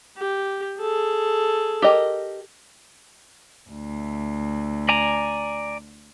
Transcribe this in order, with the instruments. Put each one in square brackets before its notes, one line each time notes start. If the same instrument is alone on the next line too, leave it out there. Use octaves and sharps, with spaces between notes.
[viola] G4
G#4 A4
[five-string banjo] G4 A#4 D#5
[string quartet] D2
[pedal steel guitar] D5 G#5 A#5